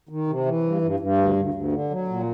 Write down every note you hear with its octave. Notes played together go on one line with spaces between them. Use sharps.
D#3
C3
E3
G2
G2
G2
D2
D2
D2
D3
F#3
A#2